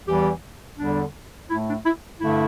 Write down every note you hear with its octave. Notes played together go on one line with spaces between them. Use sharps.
E2 E3 G3 G4
E2 D3 G3 D4
A2 A3 E4
D4
E4
G2 D3 A3 E4